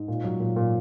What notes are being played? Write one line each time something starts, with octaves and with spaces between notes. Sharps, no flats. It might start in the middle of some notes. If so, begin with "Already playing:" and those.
Already playing: G#2
A#2
F#3
A#2
A#2